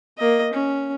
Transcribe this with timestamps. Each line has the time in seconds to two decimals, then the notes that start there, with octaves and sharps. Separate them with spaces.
0.18 A#3 D#5
0.54 C#4